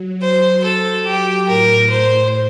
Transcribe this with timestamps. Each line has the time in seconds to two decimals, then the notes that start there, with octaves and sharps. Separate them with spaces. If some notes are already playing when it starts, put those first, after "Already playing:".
Already playing: F#3
0.22 C5
0.64 A4
1.06 G4
1.48 A2 A#4
1.90 C5